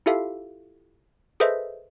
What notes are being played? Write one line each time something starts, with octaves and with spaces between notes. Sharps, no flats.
E4 F4 G4 A4 E5 F5
G#4 A4 B4 C5 D#5 E5